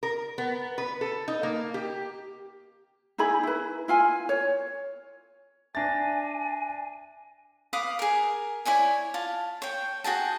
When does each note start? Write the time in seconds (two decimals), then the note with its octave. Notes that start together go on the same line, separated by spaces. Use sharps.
0.03 A#4
0.38 B3
0.78 B4
1.01 A4
1.28 D#4
1.43 A#3
1.74 G4
3.18 D#4 E4 G#4 B5
3.43 E4 B4
3.88 E4 F4 G#5
4.29 C#5
5.75 D4 E5 G#5 A5 A6 A#6
7.73 B4 F5 D6 D#6
7.99 G#4 A#4
8.65 E4 C#5 D5 G#5
9.14 F4 A5
9.62 C#5 G5
10.04 F#4 G#4 G5 A5